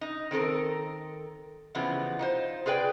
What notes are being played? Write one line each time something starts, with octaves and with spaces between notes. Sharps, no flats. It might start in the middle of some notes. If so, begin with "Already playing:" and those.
D#4
D#3 C4 A4 A#4
C#3 E3 F3 G3 B3
D#4 F4 C5
F4 G#4 B4 D5 G5